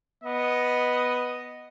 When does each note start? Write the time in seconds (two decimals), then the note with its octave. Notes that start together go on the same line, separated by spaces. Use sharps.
0.24 B3 D#5